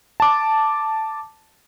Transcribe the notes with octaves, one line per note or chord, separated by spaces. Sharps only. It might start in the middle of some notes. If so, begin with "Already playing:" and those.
A5 D6